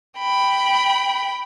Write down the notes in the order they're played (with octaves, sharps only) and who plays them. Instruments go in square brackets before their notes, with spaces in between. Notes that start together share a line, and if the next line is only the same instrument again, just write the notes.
[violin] G5 B5